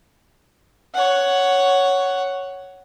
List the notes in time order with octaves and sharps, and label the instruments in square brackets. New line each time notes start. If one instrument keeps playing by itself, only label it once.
[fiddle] C#5 F#5